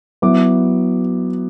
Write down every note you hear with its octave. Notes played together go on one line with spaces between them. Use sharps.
F#3 B3 E4 D6